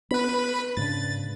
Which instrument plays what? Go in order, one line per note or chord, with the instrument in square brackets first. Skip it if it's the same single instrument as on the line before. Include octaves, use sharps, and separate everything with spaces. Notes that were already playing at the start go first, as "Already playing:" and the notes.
[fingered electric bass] B3 [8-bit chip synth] B4 B5
[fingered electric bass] G#2 C#3 D4 [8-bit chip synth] A6